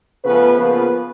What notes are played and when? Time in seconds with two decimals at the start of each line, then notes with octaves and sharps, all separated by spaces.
0.23 C#3 F3 A3 B3 B4
0.58 C#3 F3 A#3 B3 B4